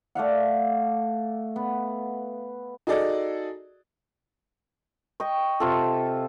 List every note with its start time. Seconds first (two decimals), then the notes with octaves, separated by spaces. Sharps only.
0.15 A3 D5 F5 F#5
1.56 B3
2.87 D#4 F#4 G#4 A4 D5 D#5
5.20 D#5 G5 C#6
5.60 C3 F4 A4